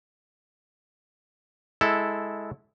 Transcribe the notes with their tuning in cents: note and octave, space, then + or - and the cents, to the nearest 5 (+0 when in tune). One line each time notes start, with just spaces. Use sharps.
G#3 +0 E4 -10 A4 +0